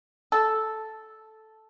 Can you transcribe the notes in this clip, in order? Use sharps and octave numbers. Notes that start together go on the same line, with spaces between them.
A4